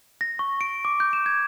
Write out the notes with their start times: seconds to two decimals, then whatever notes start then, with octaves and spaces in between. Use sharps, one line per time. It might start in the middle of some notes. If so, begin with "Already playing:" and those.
0.21 A#6
0.39 C#6
0.61 D7
0.85 D6
1.00 G6
1.13 E7
1.26 G#6